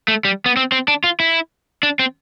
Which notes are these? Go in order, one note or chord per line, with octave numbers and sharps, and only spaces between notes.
A3
G3
B3
C4
C4
D4
F4
E4
D4
C4